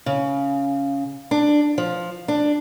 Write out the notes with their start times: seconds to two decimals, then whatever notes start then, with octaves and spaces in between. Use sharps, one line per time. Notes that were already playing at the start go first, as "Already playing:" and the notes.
0.06 C#3
1.31 D4
1.78 F3
2.28 D4